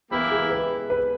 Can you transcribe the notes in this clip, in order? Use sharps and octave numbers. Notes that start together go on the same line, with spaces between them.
E3 A#3 B3 E4 G4
G#4
B4
B4